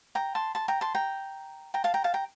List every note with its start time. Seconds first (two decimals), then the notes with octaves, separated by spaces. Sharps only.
0.15 G5 A#5
0.35 A5 C6
0.55 A5 C6
0.68 G5 A#5
0.81 A5 C6
0.95 G5 A#5
1.74 G5 A#5
1.84 F5 A5
1.94 G5 A#5
2.04 F5 A5
2.14 G5 A#5